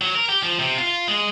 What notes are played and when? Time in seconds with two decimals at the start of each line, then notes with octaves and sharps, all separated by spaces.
0.02 F#3
0.15 A#4
0.29 G4
0.43 F3
0.59 C3
0.78 F4
1.08 G#3